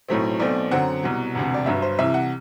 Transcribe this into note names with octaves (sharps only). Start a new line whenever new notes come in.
B1 A2 F#3 A3 C4
B1 B2 A3 C4 D5
F#2 D3 F#3 C4 F#5
C2 B2 F#3
E1 D2 C3
D5
G1 G2 F#3 E5
C5
C2 C3 E3 E5
F#5